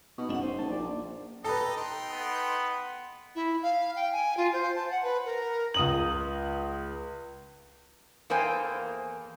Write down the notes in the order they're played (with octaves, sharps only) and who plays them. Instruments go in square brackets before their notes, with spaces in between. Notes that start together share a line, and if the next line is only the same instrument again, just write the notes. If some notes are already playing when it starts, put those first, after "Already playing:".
[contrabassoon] B2 [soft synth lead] D#4
[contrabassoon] F#1 [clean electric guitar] D4 F#5
[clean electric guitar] D#4 [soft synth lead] C5
[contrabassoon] F#1 [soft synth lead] A5
[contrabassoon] A#1 [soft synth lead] D5
[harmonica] G4 D#5 A#5 [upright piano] A4 B4
[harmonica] D#4 G5 C6
[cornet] B3
[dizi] E4
F5
G5
G#5
F4
C5
A5
F#5
B4
A#4
[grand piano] C#2 D#6 F#7
[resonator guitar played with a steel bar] E2 A#3 A4 C5 G5 G#5